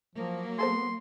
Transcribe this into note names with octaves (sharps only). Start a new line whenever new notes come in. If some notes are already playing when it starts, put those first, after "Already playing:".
F3 F#3 A#3
B3 G#4 A4 C5 C6